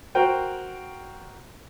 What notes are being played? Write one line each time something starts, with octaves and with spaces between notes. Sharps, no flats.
F#4 A#4 C5 G5